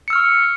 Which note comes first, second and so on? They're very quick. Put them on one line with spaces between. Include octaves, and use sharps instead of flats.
C#7 E6 F6 C#6